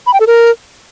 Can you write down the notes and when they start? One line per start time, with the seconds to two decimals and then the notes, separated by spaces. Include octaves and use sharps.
0.07 B5
0.13 G5
0.20 A4
0.27 A#4